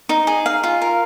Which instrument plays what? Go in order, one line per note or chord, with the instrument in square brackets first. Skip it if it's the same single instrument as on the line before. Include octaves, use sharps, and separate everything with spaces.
[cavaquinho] D#4
G#4
F5
F4
A#4